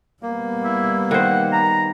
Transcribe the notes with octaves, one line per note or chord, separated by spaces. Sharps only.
G3 A#3 B3
E4
D#3 C5 F#5
A#5